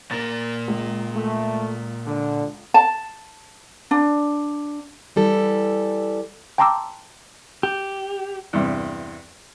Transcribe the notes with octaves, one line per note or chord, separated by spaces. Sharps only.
A#2 A#4 A6
C#2
A3
D3
A5
D4
E3 G3 A4
G5 A5 A#5 C6 D6 E6
G4
E2 G2 C3